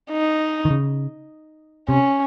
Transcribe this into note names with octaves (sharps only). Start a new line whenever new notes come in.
D#4
D#3
C#3
C3 C#4